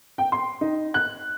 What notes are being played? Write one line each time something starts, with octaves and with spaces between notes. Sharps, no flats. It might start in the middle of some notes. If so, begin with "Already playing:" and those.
G5
C6
D#4
F#6